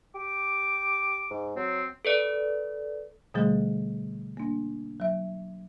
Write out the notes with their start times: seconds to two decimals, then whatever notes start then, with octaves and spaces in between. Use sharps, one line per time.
0.15 G4 D6
1.31 G#2
1.56 F#3 C4
2.05 A4 B4 D5
3.34 B2 D3 F3 G3 A3 G#4
4.37 A#3 D4
5.00 F#3 E5